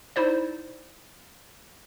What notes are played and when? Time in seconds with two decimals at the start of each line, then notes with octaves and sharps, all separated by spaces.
0.16 D#4 E4 C5 D5